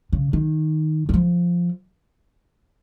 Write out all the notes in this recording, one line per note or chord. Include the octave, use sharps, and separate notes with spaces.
C#3
D#3
D#3
F3